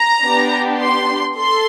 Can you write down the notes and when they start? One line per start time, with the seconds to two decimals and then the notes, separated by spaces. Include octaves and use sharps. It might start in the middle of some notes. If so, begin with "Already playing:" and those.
Already playing: A#5
0.23 B3 D4 G4
0.80 C6
1.37 A4 C6